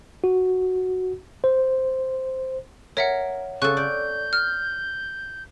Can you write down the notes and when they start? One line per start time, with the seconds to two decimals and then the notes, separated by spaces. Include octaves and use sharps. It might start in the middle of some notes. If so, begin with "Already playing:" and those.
0.24 F#4
1.44 C5
2.97 A#4 C#5 E5 F#5
3.62 C#3 A4 C#6 F#6
3.77 D5 G6
4.33 F6